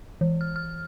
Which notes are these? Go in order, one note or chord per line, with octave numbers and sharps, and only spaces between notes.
E3
F6
F6